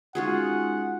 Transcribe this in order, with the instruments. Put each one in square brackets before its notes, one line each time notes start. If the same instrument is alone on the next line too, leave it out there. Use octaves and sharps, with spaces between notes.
[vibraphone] G#3 C#4 D#4 [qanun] F4 F#4 G#4 [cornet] F#5